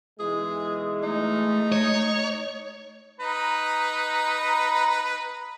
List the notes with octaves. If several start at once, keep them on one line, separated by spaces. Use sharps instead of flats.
B1 E3 G#3 G#4
A3 D#4
C#5
D#4 B4 A#5